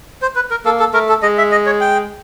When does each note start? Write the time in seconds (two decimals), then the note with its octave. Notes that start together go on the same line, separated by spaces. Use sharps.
0.22 C5
0.36 B4
0.51 A#4
0.65 A#3 A4
0.80 A4
0.94 A3 A#4
1.09 A4
1.22 G#3 D#5
1.38 E5
1.52 D#5
1.66 C#5
1.80 G5